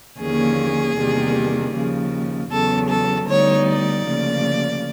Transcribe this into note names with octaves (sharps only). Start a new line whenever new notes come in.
D#2 D3 F3 A#3 C#4 G#4
E2 C3 D#3 G3 A#3
D#2 C#3 F3
E2 C#3 F#3 B3 A4
A4
D2 D3 G3 B3 D#4 C#5
D5
D2 C#3 F3 A#3